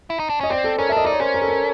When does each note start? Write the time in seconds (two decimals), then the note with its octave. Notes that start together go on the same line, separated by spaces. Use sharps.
0.10 E4
0.19 D#4
0.29 D4
0.41 C#4 D#5
0.50 C4 C5 D5
0.64 A4
0.78 C#4 A#4
0.89 E5
0.92 D4 D#5
1.05 D#4 D5
1.12 C#5
1.20 C#4 A#4 C5
1.34 A#4
1.42 A4
1.48 A#4